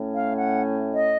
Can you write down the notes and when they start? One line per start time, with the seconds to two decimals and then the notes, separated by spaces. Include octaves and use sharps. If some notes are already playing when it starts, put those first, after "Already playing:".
Already playing: A2 A3 C#4
0.13 F5
0.37 F#5
0.96 D#5